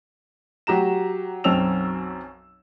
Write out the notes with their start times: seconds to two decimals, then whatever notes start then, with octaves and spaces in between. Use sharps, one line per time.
0.67 F#3 G4 A#5 E7
1.44 B1 F#2 C4 C#4 E6 F7